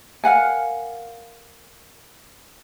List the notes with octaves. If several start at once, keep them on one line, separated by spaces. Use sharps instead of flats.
A#4 F5 F#5 G#5